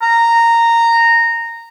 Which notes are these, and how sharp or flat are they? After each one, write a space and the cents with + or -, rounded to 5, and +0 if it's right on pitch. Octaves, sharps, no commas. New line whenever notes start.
A#5 -10